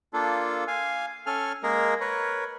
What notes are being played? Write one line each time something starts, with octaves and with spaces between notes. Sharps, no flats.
A#3 D4 F4 A4
F5 G#5
C#4 A4 G#5 F6
G#3 A#3 G#4 A#4
A#4 B4 C#5